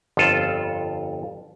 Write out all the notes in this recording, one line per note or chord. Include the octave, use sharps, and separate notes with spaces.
G1 F2 F4 A4